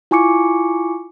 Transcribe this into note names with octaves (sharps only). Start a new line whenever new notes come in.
E4 F4 G#5 C#6 D6 C#7